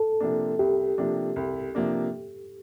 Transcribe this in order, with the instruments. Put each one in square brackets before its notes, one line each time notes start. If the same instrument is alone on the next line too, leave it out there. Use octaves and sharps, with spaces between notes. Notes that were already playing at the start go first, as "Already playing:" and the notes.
Already playing: [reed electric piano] A4
[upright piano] C3 F3 A#3 D4
[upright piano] C2 [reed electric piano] G4
[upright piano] C3 F3 A#3 D4
C2
C3 F3 A#3 D4